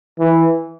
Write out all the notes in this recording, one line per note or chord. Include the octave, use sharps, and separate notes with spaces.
E3